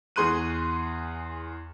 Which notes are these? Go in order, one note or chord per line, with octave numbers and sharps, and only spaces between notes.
E2 G#4 C6 C#6 F#6 D#7